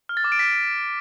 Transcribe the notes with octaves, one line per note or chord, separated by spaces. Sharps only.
F6
A6
D6
D7
B6